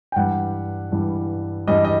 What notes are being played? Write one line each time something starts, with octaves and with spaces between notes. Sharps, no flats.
G5
G2 E3 G3 F#5
G2 E3 G3
G2 E3 G3 D#5
D#5